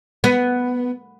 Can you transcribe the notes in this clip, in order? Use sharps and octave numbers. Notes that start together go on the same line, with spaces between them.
B3